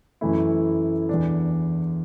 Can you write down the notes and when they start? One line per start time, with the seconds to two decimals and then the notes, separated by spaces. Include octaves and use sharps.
0.21 F#2 E3 A3 E4
1.09 E2 E3 D4